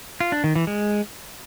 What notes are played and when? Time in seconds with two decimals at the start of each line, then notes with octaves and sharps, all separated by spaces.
0.20 F4
0.32 D4
0.44 D#3
0.55 E3
0.67 G#3